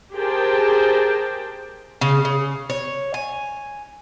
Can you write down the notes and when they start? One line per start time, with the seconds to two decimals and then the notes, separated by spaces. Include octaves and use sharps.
0.14 G4 G#4 A#4 C5 G5 A5
2.01 C#3
2.25 C#3
2.70 C#5
3.14 G#5